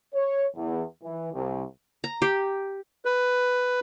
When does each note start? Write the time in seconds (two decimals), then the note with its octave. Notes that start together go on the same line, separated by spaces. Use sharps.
0.14 C#5
0.55 E2
1.02 E3
1.34 C2
2.04 A#5
2.22 G4
3.05 B4